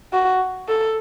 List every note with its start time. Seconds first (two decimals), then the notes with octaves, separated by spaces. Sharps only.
0.13 F#4
0.69 A4